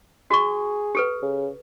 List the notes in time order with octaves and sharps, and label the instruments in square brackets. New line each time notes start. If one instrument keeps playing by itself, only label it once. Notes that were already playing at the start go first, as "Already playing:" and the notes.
[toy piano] F#4 C#6 [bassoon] G#4
[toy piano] G4 A4 B4
[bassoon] C#3